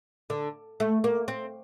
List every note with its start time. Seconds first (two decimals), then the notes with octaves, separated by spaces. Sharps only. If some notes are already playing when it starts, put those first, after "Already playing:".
0.30 D3
0.80 A3
1.04 A#3
1.28 C4